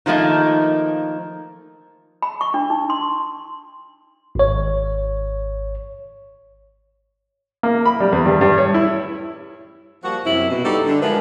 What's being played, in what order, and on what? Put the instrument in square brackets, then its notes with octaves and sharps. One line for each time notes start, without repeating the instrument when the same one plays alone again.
[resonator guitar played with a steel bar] D#3 F3 A3 A#3 D#4
[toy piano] B5
C#6
D4
D#4
C6
[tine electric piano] G#1 C#5
[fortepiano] A#3
B5
G3
E2
G2
G2
C#5
E4
[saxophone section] F3 G3 A#3 F#4
F#2 C3 E4
B2
G3 D#4 F#4 A4
D3
F3 G#3 E4 F#4 A#4 B4